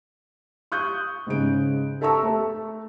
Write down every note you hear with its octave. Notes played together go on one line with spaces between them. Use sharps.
C#6 D#6 F#6 G6
G#2 C#3 D7
A4 E5 A5 A#5 C#6 E6
A3